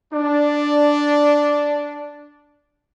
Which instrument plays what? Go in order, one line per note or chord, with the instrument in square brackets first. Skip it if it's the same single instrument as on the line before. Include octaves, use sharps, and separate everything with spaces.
[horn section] D4 [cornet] D5